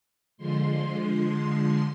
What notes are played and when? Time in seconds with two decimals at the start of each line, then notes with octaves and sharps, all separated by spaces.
0.37 D3 F3 G#3 C6